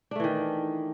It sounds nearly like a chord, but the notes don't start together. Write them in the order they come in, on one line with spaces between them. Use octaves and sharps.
D4 A3 E3 D#3